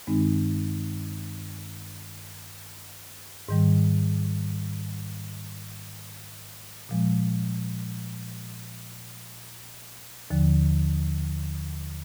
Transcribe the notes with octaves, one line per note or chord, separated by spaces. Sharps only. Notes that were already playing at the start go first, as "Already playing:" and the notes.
G2 D#3 G#3 C4 D#4
G#2 D#3 G3
A#2 F3 G#3
D#2 D3 F3